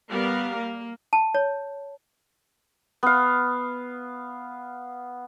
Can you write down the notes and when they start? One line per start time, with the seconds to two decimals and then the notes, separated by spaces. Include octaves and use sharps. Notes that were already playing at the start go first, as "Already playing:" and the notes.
0.11 G3 B3 A#4 F5
0.58 A#3
1.13 A5
1.35 C#5
3.03 B3 F5